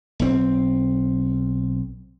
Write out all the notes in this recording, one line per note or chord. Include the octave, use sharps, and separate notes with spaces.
B1 C4